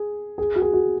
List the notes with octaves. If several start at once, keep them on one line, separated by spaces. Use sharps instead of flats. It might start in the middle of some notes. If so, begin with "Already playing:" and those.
Already playing: G#4
G#4
F#4
G#4
F#4